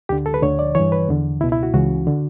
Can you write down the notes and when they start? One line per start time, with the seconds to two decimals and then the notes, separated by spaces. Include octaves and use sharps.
0.09 D2 D3 G4
0.26 A4
0.34 B4
0.43 D2 D3 C#5
0.59 D5
0.75 G2 E3 C#5
0.92 B4
1.09 E2 D3
1.40 C#2 E4
1.44 B2
1.52 E4
1.63 F#4
1.74 C#2 C#3 E3 F#4
2.07 D3